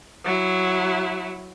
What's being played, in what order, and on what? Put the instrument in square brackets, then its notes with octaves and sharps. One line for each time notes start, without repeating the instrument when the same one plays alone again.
[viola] F#3 E4